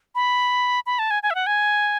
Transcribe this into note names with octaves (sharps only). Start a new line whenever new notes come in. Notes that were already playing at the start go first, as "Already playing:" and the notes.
B5
B5
A5
G#5
G#5
E5
F#5
G#5